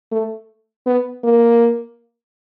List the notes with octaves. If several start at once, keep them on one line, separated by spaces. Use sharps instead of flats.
A3
B3
A#3